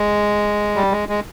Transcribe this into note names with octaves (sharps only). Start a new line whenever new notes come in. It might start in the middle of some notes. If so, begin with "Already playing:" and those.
Already playing: G#3
G3
G#3
G#3